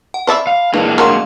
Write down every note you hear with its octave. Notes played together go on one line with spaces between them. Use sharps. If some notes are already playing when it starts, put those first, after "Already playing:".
F#5
C5 D5 E5 A5 B5
F5
E3 G#3 A#3 D4
F#3 A#4 E5 F5 C6